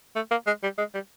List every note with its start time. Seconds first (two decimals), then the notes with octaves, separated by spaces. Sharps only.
0.16 A3
0.31 A#3
0.47 G#3
0.63 G3
0.78 G#3
0.94 G3